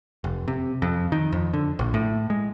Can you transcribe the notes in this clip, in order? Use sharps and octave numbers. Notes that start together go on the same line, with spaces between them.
F1
C3
F2
D#3
F2
D3
A#1
A2
G#3